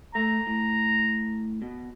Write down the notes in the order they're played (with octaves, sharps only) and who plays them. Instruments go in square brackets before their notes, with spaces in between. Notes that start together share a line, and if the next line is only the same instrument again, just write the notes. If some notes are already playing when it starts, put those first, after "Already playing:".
[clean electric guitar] A3 [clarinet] A#5
[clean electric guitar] A2
B2